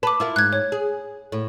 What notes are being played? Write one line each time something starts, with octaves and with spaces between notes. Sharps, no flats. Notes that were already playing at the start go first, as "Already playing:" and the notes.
B4 A5 D6
E4 F4 A#4
G#2 F#6 G#6
C#5
G#4
A2